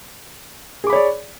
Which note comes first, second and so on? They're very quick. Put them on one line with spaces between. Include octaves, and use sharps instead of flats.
G#4 D6 B5 C#5 D5